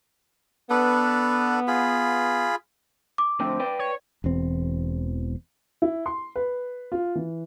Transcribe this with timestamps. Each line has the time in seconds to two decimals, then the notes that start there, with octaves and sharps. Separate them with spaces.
0.70 B3 D4 A4 B4
1.68 F4 G#4 B5
3.18 D6
3.40 F2 A2 D3 C4
3.60 B4 D5 G5
3.79 C#5
4.24 E1 E2 C4
5.82 E4
6.06 C6
6.36 B4
6.92 F4
7.15 E3